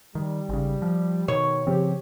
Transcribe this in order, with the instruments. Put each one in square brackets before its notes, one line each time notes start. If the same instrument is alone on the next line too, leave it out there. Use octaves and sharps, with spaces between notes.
[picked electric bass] D#3 [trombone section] G3
[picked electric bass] G#1 C#3
F3
[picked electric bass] B2 [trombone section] D#3 [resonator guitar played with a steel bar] C#5
[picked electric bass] C#3 F3 C4 [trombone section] G4